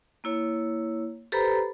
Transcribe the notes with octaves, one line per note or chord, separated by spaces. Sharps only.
A#3 E4 C#5
G4 A4 B4 C5 A#5 B5